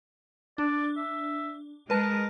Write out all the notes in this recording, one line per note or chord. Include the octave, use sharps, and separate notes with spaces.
D4 D5
E5
G#3 A#4 B4 A5